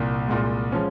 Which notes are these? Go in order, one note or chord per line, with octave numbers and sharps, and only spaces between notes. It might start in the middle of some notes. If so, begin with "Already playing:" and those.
Already playing: C2 A#2
C2 A#2 G#3
F3 G#3 C#4